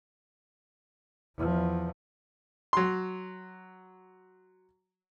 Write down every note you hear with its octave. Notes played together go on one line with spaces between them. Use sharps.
E2 F3
F#3 C6